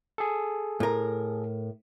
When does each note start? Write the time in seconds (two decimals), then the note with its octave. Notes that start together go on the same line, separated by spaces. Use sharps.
0.18 G#4 A4
0.80 A2 A#4